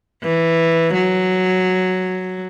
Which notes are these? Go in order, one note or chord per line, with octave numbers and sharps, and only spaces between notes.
E3
F#3